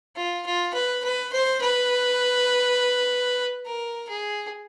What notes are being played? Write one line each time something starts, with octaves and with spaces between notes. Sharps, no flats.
F4
F4
B4
B4
C5
B4
A#4
G#4